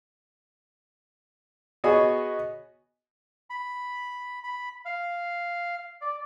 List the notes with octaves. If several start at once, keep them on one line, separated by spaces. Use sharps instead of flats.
B3 F#4 G#4 C#5 D#5 G#5
B5
B5
F5
D5